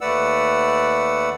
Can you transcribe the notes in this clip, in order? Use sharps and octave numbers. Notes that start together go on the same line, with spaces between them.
D#2 A3 B4 D5 F#5 E6